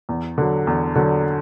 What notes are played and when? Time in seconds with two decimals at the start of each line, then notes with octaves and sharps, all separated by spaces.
0.09 E2
0.38 D3 F#3
0.67 E2
0.95 D3 F#3